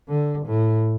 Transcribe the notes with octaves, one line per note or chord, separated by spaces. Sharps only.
D3
A2